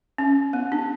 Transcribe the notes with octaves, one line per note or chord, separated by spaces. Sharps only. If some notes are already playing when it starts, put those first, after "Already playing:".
C#4
B3
D4